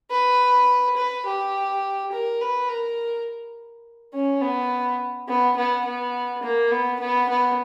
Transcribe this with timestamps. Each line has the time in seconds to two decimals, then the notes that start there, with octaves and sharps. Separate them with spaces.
0.11 B4
0.97 B4
1.26 G4
2.12 A#4
2.41 B4
2.69 A#4
4.13 C#4
4.42 B3
5.28 B3
5.57 B3
5.85 B3
6.43 A#3
6.71 B3
7.00 B3
7.29 B3